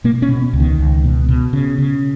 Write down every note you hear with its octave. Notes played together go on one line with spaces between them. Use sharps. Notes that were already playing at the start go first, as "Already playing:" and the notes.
B2 A#3
C#4
B2
B3
C#2
D#3
C#2
B2
B2
C#3
C#3